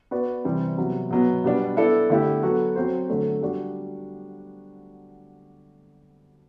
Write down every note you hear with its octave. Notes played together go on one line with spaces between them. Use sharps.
B3 F#4 B4 D5
C3 E3 G3 C4
C3 F#3 B3
B2 F#3 B3
B2 G3 B3 D4
B3 E4 A4 D5
D3 A3 E4 G4
F#3 B3 F#4 A4
F#3 C4 F#4 C5
D3 F#3 A3 D4
G3 D4 F#4